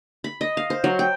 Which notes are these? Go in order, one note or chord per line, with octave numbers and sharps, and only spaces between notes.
B5
D#5
F5
C5
F#3
G5